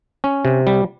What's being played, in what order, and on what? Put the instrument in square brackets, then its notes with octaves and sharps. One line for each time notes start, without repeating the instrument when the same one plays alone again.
[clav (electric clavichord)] C#4
C3
G3